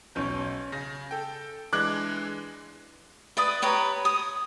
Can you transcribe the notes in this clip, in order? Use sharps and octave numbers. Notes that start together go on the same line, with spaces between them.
B1 C#4 G6
C#3 A#6
A4 G5
E3 G#3 D4 D6 F#6 G#6
B4 D5 D#6
G4 B4 C#5 A#5
D#6